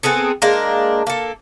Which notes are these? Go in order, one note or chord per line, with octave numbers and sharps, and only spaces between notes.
B3 C4 G#4 A4
G#3 A#3 D4 A#4
A#3 A4